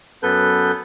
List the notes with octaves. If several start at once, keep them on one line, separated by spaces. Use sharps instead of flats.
F#2 B3 A4 B4 G6